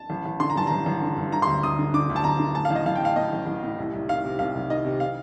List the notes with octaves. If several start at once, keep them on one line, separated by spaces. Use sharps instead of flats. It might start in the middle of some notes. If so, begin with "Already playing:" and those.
Already playing: A5
A1
A1
D3 C6
A#5
G2 A5
A1 A#5
A1
D3
G2
D3 A#5
C6
D2
D2 D#6
D3
D3 D6
D2
A5
D2 A#5
D3
A2 A5
F5
A1 D#5
A1 F5
G5
A2 F5
A2 D#5
A1
A1
A2
C2
C2
D#3 F5
C3
C2 F5
C2
D#3 D#5
C3
F5